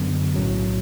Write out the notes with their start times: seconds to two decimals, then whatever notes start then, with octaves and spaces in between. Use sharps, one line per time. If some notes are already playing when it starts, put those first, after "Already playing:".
Already playing: F#2 D3 F#3 B3
0.34 B1 A2 F#3 C#4